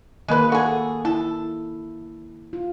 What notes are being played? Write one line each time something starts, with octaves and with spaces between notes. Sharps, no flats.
D#3 G#3 A#3 A#4 B4
F#4 G#4 A4
E4 A4
F4